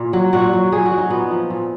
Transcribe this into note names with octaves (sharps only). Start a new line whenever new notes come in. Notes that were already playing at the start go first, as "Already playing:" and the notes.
Already playing: A#2 F4
F#3
A#2 F#4
F#3
A#2 G#4
F#4
F#3
D#4
A#2 B3
F3
A#2